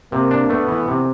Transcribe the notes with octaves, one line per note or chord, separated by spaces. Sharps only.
C3 A#3
D4
A3 B3
E3
C3